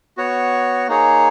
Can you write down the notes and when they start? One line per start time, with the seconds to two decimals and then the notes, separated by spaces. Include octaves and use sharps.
0.17 B3 F#4 C#5
0.88 A#3 D#4 G#4 C#5